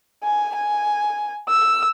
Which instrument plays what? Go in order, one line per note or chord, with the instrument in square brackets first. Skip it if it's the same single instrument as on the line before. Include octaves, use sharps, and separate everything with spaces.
[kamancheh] G#5
G#5
E6